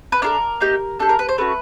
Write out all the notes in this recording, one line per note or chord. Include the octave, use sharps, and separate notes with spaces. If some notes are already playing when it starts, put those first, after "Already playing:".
B4
D4 F4 A4 A#4
A#3 D#4 G4
D4 G4 A4
A#4
B4
C5
A3 C#4 F#4 B4